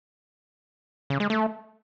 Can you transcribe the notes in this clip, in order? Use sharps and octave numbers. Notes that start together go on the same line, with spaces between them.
C#3
G#3
A3